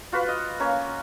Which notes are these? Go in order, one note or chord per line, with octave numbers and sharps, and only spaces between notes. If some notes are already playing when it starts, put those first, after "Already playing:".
F4 F#4 B4
D#5
A#3 C#4